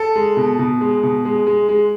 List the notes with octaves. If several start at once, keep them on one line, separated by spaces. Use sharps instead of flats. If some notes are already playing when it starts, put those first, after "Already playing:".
Already playing: A4
G#3
B2
B2
G#3
B2
G#3
G#3
G#3